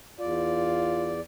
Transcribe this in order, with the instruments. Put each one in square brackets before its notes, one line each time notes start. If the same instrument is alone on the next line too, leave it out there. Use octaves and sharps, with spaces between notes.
[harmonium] E2 D5 [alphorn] F4